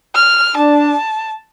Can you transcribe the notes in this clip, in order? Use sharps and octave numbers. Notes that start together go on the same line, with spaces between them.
F6
D4 A5